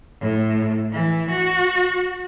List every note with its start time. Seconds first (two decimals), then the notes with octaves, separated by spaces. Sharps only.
0.21 A2
0.92 E3
1.31 F#4